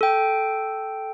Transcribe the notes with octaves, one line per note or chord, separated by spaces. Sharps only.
A4 G5